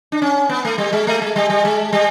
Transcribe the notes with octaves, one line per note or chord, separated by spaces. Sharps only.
D4
C#4
B3
A3
G3
G#3
A3
G#3
G3
G3
G#3
G3